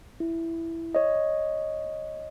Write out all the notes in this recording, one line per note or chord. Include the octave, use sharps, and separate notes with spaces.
E4
C#5 D#5